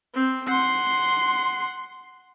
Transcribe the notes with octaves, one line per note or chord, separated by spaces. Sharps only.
C4
F#5 C6 C7